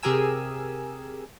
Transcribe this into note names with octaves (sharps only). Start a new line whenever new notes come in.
C3 G4 G#4 A#4 G#5 E6